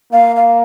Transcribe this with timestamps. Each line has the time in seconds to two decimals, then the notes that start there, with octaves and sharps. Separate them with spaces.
0.13 A#3 F5
0.36 F5